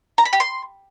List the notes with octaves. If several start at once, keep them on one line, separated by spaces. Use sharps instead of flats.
A#5
B5
G4
C6